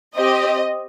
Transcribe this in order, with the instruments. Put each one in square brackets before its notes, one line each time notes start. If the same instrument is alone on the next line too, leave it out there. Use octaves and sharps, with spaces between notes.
[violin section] C4 G4 D#5